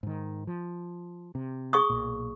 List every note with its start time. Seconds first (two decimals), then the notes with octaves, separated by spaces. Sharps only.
0.03 G#2 D#3
0.47 F3
1.35 C3
1.73 G#4 C#6 D#6
1.90 B1 A#2